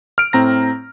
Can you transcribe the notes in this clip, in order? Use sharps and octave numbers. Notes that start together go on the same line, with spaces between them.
F6 D7
A2 C4 A#5 A#6